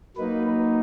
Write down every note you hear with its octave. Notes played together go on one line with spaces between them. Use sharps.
F#3 A#3 D#4 B4